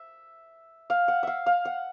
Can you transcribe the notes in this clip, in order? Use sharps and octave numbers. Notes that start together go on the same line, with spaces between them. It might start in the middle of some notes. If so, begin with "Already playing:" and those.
Already playing: E5
F5
F#5
E5 F5
F5
F#5